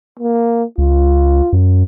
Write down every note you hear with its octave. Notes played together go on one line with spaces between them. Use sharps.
A#3
C#2 F4
F#2